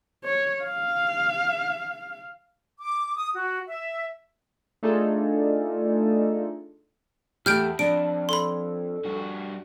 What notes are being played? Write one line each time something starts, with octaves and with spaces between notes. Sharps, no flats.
C#5
F5
D6
D#6
F#4
E5
A3 D4 D#4 F4 G#4 A4
E2 A3 G4 B5 F6 G6 D7
F2 D4 D7
A4 B5 C6
G2 F#4